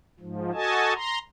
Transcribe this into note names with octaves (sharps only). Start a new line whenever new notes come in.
G#2 F3
F#4 A4 D#5 G#5 A5
A#5 C6